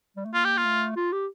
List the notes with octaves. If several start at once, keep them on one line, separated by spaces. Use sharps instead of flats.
G3
A3
A#3 F4
G4
F4
A3
F4
G4